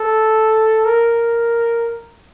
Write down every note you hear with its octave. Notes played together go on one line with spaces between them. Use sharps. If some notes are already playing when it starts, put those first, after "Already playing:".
Already playing: A4
A#4